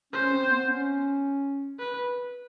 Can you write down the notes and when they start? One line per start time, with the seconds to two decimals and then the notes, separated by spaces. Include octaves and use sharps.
0.13 C#4 C5
0.32 C4
0.50 B3
0.68 C#4
1.79 B4